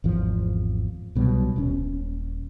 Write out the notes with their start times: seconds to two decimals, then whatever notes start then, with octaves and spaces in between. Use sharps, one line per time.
0.04 G#1 E2 F3
1.15 C2 B2 F#3 G3
1.56 D#1 C4 C#4